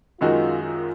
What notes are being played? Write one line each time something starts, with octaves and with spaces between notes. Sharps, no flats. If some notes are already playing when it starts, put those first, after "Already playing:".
F#2 D#3 G#3 D#4 F4 F#4
F4